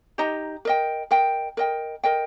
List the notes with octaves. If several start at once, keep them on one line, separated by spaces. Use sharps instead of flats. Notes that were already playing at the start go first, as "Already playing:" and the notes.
D#4 G4 D#5 A#5
A#4 D#5 G5
A#4 D#5 G5
A#4 D#5 G5
A#4 D#5 G5